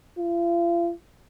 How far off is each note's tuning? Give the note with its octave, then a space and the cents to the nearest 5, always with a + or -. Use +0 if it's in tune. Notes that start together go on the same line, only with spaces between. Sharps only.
F4 -40